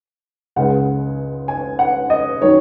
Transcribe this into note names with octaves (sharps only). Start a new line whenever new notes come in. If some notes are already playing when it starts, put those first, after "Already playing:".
C#2 C#3 G#3 F#5
G#5
F#5
D#5
D#3 F#3 C#4 C#5